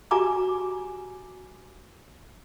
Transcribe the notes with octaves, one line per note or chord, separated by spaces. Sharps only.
F#4 G4 G#5 A#5 D6